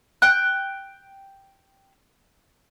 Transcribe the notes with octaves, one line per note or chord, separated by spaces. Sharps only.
G5 F#6